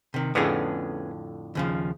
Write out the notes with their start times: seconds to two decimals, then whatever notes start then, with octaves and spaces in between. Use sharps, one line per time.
0.14 C3 D#3
0.35 F2 A2 D3 B3 C#4 G#4
1.55 D#2 C#3 F3